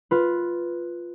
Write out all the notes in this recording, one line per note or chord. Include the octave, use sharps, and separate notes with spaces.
F4 B4